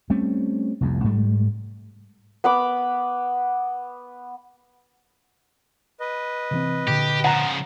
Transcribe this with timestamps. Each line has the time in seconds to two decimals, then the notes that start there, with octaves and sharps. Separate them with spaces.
0.10 G3 A3 C4 C#4
0.81 F1 C2 F2
1.04 G#2 G3 A3
2.44 B3 B5 D6
6.00 B4 D#5
6.51 C3 E3 C4
6.88 A#2 D3 G4
7.24 C#3 F3 F#5 A#5